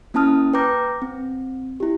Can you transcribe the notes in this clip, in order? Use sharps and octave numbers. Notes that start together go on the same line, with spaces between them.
A#3 C#4 E4 A5 D#6 F6
B4 G5 A#5 D6 G6 A#6
C4
E4 G4